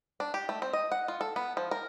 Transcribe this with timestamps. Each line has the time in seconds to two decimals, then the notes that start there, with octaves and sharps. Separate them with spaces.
0.20 D4
0.34 G4
0.49 A3
0.62 C4
0.73 D#5
0.92 F#5
1.08 F4
1.21 A4
1.36 B3
1.57 F3
1.71 A#4